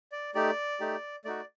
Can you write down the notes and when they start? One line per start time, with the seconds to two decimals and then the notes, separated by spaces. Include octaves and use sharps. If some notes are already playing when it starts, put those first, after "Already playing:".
0.12 D5
0.35 A3 D#4 G4 D5
0.80 A3 D#4 G4
1.25 A3 D#4 F#4 D5